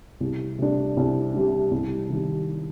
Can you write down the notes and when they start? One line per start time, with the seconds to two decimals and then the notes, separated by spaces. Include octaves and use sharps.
0.20 C2
0.59 C3 G3 D4
0.97 C2
1.34 C3 G3 D4
1.71 C2
2.09 C3 D#3 G3